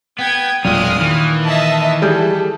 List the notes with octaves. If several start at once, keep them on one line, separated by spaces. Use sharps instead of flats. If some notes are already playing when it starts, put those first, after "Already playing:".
B3 G5 G#6
E1 A#2 F#3 G#3 C#4 D#6 F6
D#3 E3
D#5 E5 A5
G3 G#4 A4 G6